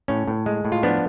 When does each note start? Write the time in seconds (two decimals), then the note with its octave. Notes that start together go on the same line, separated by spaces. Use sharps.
0.08 A2 C#4
0.28 A2
0.46 G#3
0.65 A2
0.72 F4
0.83 F3 B3 D4